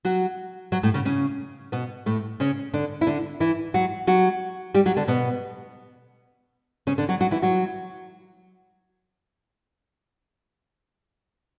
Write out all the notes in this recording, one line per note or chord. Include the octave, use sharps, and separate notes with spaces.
F#3 F#4
F#3 F#4
A2 A3
C#3 C#4
C#3 C#4
B2 B3
A2 A3
C#3 C#4
D3 D4
E4
D3 D4
E3 E4
F#3 F#4
F#3 F#4
G3 G4
F#3 F#4
D3 D4
B2 B3
C#3 C#4
D3 D4
F#3 F#4
F#3 F#4
E3 E4
F#3 F#4